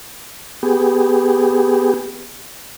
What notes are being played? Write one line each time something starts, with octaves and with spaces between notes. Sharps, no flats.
B3 G4 G#4